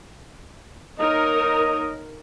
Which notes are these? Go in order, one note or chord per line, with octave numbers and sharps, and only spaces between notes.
A#3 D#4 A#4 C#5 D#5